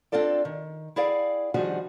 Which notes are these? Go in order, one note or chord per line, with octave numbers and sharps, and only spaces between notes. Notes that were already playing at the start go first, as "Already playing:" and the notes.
C4 D4 F4 A4 D5
D#3
E4 G#4 D5 F5 G5
D#3 F3 G3 D4 F#4 G#4